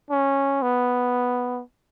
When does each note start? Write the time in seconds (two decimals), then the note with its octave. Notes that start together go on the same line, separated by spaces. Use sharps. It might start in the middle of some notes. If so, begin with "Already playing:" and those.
0.11 C#4
0.62 B3